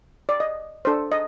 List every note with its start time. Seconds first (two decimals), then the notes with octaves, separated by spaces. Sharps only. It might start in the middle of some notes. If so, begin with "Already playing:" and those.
0.29 D5
0.40 D#5
0.85 D4 A4 C5
1.12 D#5